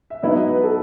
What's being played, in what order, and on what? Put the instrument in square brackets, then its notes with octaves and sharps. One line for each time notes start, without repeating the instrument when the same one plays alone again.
[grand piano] E5
[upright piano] G#2 F#3 B3 E4 [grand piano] D#5
[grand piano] D#5
B4
A4